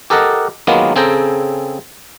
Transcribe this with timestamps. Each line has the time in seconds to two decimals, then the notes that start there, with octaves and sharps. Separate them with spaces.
0.10 G4 A4 A#4 D#5 F#5 A5
0.67 D#3 F#3 G#3 A#3 B3 F4
0.96 C#3 C4 G#4 A4 G5 A#5